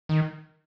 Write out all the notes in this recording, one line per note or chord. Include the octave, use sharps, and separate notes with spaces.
D#3